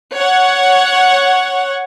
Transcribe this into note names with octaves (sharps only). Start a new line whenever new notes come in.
C#5 F#5